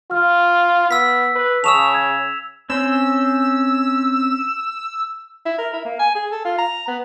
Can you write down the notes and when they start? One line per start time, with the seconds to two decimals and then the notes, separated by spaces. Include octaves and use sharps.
0.11 F4 F6
0.91 B3 E6 B6
1.35 B4
1.64 C#3 A5 C#6 D#6 E6 E7 F7
1.94 G#6
2.70 C4 C#4 C5 E6
5.46 E4
5.58 A#4
5.73 E4
5.85 A#3
6.00 G#5
6.15 G#4
6.32 A4
6.45 F4
6.58 A#5
6.88 B3